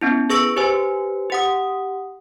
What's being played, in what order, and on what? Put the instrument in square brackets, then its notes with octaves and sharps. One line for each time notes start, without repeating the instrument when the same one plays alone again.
[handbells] B3 C#4 E4
G#4 B4 C#6 E6 A#6 D7
G4 B4 C5 G#5
G4 F#5 D#6